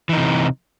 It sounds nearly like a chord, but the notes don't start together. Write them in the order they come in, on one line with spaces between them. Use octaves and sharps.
E3 D#4 C3